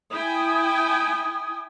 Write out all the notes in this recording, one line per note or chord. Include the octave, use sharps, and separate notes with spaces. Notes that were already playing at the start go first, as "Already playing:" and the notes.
E4 G5 G#5 D#6